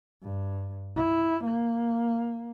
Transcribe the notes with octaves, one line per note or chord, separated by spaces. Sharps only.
G2
E4
A#3